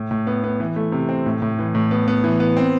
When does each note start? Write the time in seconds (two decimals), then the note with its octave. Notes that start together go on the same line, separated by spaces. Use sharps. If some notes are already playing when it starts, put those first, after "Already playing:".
Already playing: A2
0.11 A2
0.27 B3
0.44 B3
0.60 E3
0.76 A3
0.92 C3
1.09 C4
1.26 A2
1.42 A2
1.59 E3
1.75 A2
1.91 B3
2.08 B3
2.24 E3
2.40 B3
2.57 C4